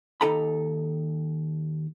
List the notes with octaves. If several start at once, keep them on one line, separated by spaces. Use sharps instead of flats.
D#2 D#4 A4 A#5 B5